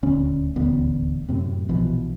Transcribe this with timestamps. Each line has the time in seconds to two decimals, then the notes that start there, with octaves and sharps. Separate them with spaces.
0.03 D#1 D2 C#4
0.56 D#1 A1 D2 B3
1.29 F#2 A2 C3
1.69 A#1 B2 E3 F3